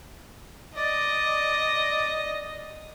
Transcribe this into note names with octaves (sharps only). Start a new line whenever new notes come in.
D5 D#5